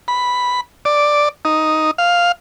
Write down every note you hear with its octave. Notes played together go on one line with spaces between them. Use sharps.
B5
D5
D#4
F5